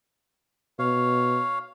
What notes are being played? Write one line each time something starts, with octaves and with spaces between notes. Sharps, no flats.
B2 C#5 F5